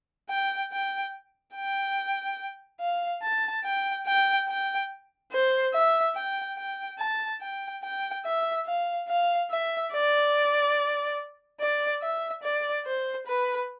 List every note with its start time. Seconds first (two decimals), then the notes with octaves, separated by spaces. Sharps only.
0.29 G5
0.72 G5
1.55 G5
2.80 F5
3.22 A5
3.64 G5
4.07 G5
4.48 G5
5.32 C5
5.73 E5
6.15 G5
6.57 G5
6.99 A5
7.41 G5
7.83 G5
8.25 E5
8.66 F5
9.08 F5
9.51 E5
9.93 D5
11.60 D5
12.02 E5
12.43 D5
12.85 C5
13.27 B4